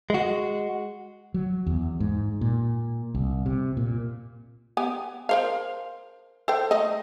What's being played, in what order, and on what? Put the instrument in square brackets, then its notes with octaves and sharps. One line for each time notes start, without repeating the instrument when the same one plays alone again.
[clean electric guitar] G#3 F#4
[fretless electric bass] F#3
E2
G#2
A#2
C2
C3
A#2
[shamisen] B3 G4 G#5
A#4 C5 F5
A4 C5 G5
A3 D#5